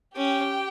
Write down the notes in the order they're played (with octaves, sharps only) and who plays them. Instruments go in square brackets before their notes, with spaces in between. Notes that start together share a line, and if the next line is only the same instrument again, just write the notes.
[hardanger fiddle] C#4 [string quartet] G4 G5